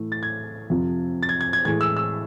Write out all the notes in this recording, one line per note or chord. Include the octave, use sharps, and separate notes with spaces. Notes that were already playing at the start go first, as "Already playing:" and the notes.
Already playing: A2 E3 A3
A6
G#6
F2 C3 F3
A6
G#6
G#6
G#6
A2 E3 G#3 G#6
E6
E6